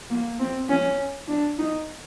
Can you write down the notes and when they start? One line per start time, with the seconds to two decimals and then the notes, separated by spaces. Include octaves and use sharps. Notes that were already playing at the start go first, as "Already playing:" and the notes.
0.10 A#3
0.39 C4
0.69 C#4
1.28 D4
1.58 D#4